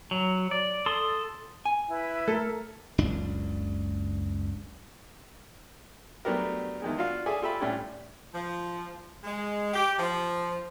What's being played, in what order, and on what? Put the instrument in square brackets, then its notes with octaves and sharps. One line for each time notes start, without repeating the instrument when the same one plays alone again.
[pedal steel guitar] F#3
D5
A4 C6 D#6
[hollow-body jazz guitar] G#5
[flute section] E4 B4
[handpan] A3 A#4 [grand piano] A4
[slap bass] F#1 C#2 D4
[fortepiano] F#3 A3 B3 D4 G4 A#4
E2 D#3 G#3
D4 F4 F#4 F5
G#4 A4 D5 E5 G#5
F4 G4 A4 E5 B5
A2 G3 C#4 D4
[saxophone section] F3
G#3
G4
F3